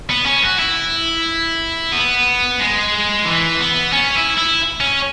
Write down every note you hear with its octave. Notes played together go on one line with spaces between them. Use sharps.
B3
C#4
F#4
E4
B3
G#3
E3
B3
C#4
E4
E4
C#4